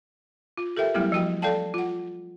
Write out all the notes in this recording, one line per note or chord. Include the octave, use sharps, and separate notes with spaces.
F4
G4 A4 A#4 E5 G5
F#3 G3 A3 B3 E4 G4
F3 F#3 F#4 G5
A4 D5 F5 G5 A5
F4 F#5